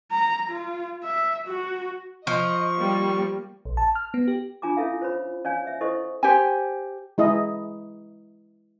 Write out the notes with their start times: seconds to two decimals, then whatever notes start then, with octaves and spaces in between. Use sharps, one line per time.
0.11 A#5
0.50 F4
1.04 E5
1.47 F#4
2.27 F3 D#5 C#6
2.78 G3 A#3
3.65 A#1
3.77 A5
3.95 F6
4.14 B3
4.28 G4
4.62 D4 F4 G#5 A#5 D6
4.77 C#4 E4 A4 E5 F5
5.00 F4 C5 C#5 B5
5.44 C#4 C#5 D5 F5 G#5
5.65 C#5 E5
5.81 E4 A4 C5 D#5 C#6
6.23 G4 C5 G#5
7.18 G#3 E4 D#5